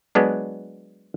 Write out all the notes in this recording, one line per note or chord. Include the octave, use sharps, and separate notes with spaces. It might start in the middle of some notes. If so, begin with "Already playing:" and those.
F#3 G#3 B3 D4